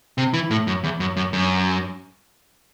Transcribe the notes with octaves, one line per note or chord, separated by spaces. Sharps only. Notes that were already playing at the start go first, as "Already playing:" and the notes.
C3
E3
A2
F#2
E2
F#2
F#2
F#2